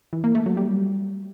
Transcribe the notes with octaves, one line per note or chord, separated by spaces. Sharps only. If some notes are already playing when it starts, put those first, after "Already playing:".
E3
A#3
A3
F#3
G3